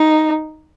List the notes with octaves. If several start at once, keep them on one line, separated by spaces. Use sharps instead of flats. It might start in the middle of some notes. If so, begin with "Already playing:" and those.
Already playing: D#4